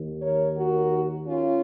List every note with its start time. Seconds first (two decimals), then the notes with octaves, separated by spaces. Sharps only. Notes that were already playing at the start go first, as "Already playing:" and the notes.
Already playing: D#2 D#3
0.22 A#4 C#5
0.56 F#4 A#4
1.25 C#4 F4